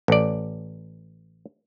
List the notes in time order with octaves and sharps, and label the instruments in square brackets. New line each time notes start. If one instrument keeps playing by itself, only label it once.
[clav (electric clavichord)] A1 D5